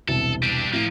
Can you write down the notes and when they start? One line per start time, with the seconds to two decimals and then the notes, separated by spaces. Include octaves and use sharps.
0.08 E1 C2 A4
0.43 G3 D4
0.73 A2 F3 A#3